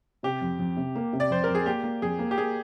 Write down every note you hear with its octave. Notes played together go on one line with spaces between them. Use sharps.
C3 G4
F2
F2
C3
A#3
C3
D5
F2 C5
F2 A#4
G#4
A#3 G4
A#3
F2 G#4
A#3
G4
A#3 G#4